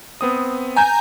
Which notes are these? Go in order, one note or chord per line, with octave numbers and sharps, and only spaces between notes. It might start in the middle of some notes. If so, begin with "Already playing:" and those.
B3 C4 D#6
G#5 A#5 G6